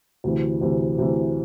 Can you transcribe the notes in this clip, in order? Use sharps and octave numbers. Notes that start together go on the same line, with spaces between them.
D2 C3 E3
D2 C3 E3
D2 C3 E3